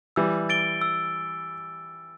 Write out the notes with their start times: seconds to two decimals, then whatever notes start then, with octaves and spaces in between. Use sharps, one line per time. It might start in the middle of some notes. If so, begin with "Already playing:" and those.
0.16 E3 G3 E6
0.49 A6 D7 G7
0.81 E6